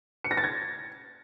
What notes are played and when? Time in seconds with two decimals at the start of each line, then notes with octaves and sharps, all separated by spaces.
0.24 C#7
0.31 A#6
0.37 A6
0.44 G#6